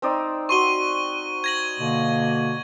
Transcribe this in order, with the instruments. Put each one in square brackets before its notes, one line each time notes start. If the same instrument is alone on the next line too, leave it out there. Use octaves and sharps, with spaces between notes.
[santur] C4 D#4 D5
[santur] F#4 C6 [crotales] C#6 D#7 G7
[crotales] G#6 A#6 F#7
[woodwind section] B2 D3 A#3